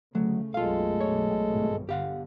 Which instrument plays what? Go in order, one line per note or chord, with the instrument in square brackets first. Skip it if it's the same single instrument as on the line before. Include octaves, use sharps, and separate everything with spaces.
[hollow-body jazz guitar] D2 F#3 [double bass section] C#3 [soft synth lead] A3
[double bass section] B1 F#2 [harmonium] G#3 A4 [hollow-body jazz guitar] F4 F5
[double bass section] B1 [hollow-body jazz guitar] C#5
[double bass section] G#1 G2 B2
[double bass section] G1 D3 [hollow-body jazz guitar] G4 F5 F#5